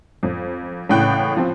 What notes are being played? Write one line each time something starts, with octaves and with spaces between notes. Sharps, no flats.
F2
A1 A2 C#3 G5 F#6
F3 C4